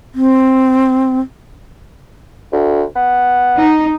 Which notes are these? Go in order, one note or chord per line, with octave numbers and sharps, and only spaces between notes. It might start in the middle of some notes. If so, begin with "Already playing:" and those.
C4
D2
B3
D#4